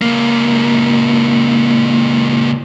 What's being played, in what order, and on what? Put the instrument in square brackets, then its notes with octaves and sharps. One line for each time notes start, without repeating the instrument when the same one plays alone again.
[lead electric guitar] C#2 A#3